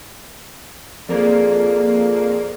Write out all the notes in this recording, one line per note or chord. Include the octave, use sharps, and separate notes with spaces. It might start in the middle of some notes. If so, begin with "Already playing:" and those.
F2 A#3 G#4 A4 D5